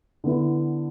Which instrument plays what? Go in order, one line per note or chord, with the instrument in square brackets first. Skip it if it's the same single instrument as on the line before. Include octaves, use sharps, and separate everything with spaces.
[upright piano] D3 B3 E4